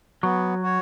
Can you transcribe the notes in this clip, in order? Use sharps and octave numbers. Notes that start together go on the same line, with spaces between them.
F#3 B3
F#4 C#5